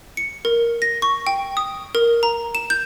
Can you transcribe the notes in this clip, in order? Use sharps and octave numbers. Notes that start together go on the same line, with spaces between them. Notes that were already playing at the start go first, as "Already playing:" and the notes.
C#7
A#4
A#6
C#6
G5
D#6
A#4
A#5
E7
G6